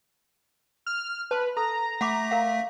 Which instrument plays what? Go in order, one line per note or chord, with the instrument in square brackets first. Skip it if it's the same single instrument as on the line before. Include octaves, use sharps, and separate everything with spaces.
[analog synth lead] F6
[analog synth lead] B4 [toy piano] A5 C6
[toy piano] A4 [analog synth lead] A#5
[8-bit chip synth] A3 B6 [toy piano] F#5 B5 D6
[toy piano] A#4 F5 F#5